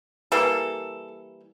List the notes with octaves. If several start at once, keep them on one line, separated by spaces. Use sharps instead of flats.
E3 G3 A#3 A4